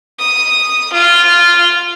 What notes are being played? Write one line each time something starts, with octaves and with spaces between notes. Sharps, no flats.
D#6
F4